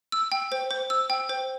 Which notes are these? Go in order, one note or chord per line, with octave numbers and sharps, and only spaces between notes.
E6
G5
C5
C5
E6
G5
C5